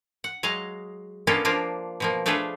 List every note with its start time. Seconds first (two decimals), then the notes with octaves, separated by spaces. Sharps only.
0.24 F#5
0.43 F#3 G#3 D#5 F5
1.27 A#3 B3 C#4 D4 F4 A4
1.45 F3 A#3 D4 F4
2.00 B2 F3 A#3
2.26 A3 D4 F4 G#4 A4 B4